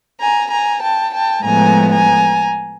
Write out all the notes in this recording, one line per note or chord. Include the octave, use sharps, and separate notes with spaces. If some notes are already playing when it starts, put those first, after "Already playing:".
G#5 A#5
G#5 A#5
G5 A5
G5 A5
A2 F3 G#3 B3 G#5 A#5
G#5 A#5